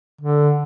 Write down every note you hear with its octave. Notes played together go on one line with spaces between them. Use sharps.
D3